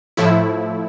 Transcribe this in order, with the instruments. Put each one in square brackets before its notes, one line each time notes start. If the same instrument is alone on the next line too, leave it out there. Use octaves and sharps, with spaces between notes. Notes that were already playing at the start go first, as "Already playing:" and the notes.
[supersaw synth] A2 F3 A3 E4